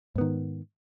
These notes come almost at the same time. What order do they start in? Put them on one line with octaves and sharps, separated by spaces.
G#2 B3 D#3